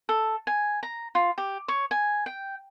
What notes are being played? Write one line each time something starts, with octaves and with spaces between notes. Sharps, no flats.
A4
G#5
A#5
F4
G4
C#5
G#5
G5